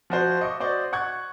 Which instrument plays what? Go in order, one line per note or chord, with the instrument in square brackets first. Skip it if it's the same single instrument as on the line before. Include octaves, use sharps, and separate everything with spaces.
[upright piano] F3 F#4 C5
D#5 C#6 D6
F#4 C5 D5 D#5
F#5 C#6 F#6 G#6